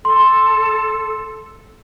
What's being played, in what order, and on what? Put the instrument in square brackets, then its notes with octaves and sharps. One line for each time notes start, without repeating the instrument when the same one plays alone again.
[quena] A4 [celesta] C6